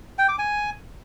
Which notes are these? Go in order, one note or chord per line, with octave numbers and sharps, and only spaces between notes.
G5
D6
G#5